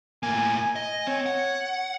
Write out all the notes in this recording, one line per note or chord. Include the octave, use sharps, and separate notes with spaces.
A2 A#3 G#5
G#5
D#5
C4 C#5
F#5